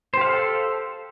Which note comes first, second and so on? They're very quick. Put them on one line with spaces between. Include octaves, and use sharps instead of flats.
C5 G4 F5 A4